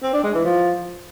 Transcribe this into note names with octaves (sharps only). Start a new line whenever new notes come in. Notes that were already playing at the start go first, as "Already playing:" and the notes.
C4
D4
G#3
E3
F3